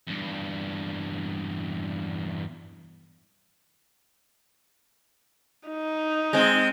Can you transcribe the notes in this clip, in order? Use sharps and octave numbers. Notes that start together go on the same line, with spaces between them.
E2 G2
D#4
G#3 C4